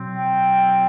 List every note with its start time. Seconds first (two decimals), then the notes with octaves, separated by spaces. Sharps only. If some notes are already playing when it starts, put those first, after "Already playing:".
Already playing: B2 F#3 C4
0.17 G5